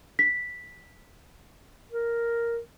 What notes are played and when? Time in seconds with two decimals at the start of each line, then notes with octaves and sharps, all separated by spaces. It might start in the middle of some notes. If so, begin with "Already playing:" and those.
0.19 B6
1.91 A#4